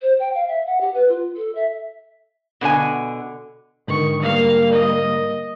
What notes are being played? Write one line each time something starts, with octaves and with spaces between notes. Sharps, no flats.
C5
G5
F5
E5
F#5
G4
B4
F4
A4
E5
B2 D3 C#5 G#5
G#2 D3 D#3 C#6
G3 A#3 F5
D#5